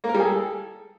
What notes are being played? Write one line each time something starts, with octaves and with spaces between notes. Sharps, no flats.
A#3
A#4
G3
G#4
A4